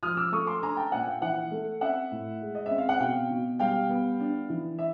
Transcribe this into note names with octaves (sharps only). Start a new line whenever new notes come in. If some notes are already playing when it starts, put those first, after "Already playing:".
F3 D#6 F6
D6 E6
A3 C#6 D#6
C6 D6
D4 G#5 A#5
G5 A5
A#2 F#5 G#5
F5 G5
E3 E5 F#5
A3
C4 E5 F#5
A2
G#3
D#5
C4 E5
F5
F#5
B2 F5 G5
B2
G3 F5 G5
B3
D4
E3
E5